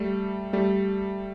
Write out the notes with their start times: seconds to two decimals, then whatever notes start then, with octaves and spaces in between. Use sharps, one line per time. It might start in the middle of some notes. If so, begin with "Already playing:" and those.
Already playing: G3 A3
0.53 G3 A3